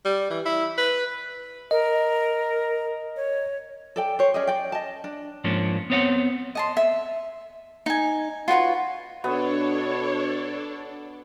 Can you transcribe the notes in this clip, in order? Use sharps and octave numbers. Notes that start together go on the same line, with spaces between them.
G3
E3
E4
B4
A#4 D#5
C#5
A4 D5 G5
C5 C#5
C#4 G#4 D5 D#5
D5 G5
D#5 A5
D4
G#2 F3 A#3 C#4 D4
B3 C4 C#5 D5 F#5
D#5 A5 C6
E5
D#4 G#5
F4 F#4 B4 C#5
B2 B3 D4 A4 C#5